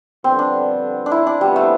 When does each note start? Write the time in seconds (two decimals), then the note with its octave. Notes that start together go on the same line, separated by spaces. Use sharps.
0.24 F2 D3 G3 B3 C4
0.39 D4
1.06 D4
1.11 E4
1.27 D4
1.41 C3 F3 G3 B3
1.56 A3